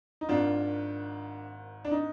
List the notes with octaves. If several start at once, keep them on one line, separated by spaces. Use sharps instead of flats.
D#4
G#1 G#2 D#3 D4 F4
D4
D#4